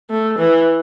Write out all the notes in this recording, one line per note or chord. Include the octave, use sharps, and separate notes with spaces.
A3
E3